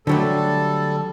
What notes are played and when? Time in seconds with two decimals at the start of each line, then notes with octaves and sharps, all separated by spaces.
0.07 D3 F#3 G3 A3 A4